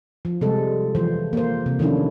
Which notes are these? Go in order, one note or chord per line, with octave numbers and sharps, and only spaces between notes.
F3
C3 G3 G#3 A4
E3 F3 C5
A#3 C5
C3
D#3 F3 A3 C#4 D4 E4